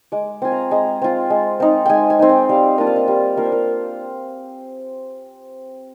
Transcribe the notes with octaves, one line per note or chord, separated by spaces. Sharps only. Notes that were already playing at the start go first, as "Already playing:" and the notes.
G#3 D6
C4 F4 G#5
A#5
G#3 A#5
C4 F4
G#3
C4 D#4
G#3 G5 G#5
G#5
C4 D#4
G5
G3 F5
A#3 D4 F4 D#5
F5
D#5
G3 C5
A#3 D4 F4 A#4
C5
A#4